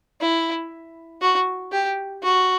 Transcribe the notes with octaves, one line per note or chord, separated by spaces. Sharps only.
E4
F#4
G4
F#4